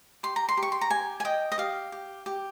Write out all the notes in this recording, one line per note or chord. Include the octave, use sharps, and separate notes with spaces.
G4 C6
A#5
C6
G4
C#6
C6
A#5
G4 G#5
G#5
D#5 G5
D#5
G4 F5
G4
G4